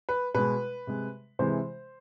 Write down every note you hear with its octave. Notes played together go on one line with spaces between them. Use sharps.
B4
B2 G#3 B4
C3 G#3
C3 E3 G#3 C5